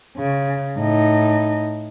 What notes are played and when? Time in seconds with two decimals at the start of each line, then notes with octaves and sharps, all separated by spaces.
0.18 C#3
0.78 A2 D#4